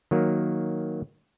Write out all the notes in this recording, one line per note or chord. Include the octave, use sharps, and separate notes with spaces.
D#3 F#3 A#3